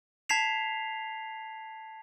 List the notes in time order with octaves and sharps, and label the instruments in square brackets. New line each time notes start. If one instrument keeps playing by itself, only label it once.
[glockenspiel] A5 G#6 B6 C7 F7